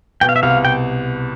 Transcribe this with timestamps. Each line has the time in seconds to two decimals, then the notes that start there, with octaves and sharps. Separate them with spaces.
0.21 B2 G5
0.29 F5
0.36 E5
0.43 C2 F5
0.65 G5